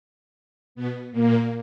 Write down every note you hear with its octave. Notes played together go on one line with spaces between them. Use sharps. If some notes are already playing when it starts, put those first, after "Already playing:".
B2 B3
A#2 A#3